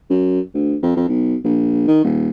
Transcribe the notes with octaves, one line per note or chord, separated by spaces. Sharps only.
F#2
D2
F2
F2
B1
A#1
D#3
D#1